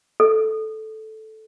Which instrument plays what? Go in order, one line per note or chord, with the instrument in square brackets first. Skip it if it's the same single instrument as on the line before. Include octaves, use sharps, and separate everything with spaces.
[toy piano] A4